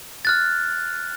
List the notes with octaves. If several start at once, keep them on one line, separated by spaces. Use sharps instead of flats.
F6 F#6 A6